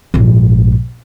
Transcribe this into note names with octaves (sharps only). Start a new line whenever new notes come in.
A#1 G#2